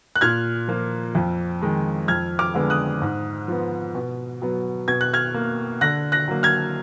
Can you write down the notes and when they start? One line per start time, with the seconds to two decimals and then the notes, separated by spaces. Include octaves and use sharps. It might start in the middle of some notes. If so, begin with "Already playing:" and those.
0.16 F#6
0.21 A#2 F6 G#6
0.68 F3 A#3
1.15 F2
1.62 D#3 G#3
2.08 F2 F6 G#6
2.39 D6 F6
2.55 D3 G#3 B3
2.70 D#6 F#6
3.02 G#2
3.48 F3 B3
3.95 B2
4.42 F#3 B3
4.88 B2 G#6
5.01 F#6
5.14 F6 G#6
5.34 A#3
5.81 D3 F#6 A#6
6.12 F#6 A#6
6.28 F#3 A#3
6.43 F6 G#6